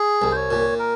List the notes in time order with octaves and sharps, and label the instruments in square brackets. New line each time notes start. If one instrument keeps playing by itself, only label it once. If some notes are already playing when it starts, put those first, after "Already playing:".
Already playing: [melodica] G#4
[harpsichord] C2
[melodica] C5
C#5
[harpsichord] A#2
[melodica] A#4